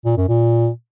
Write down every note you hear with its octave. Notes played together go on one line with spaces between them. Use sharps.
A#2
F#2
A#2